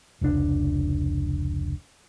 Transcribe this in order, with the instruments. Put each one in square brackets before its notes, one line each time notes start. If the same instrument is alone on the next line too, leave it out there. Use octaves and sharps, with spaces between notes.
[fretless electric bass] F1 C#2 G#2 D4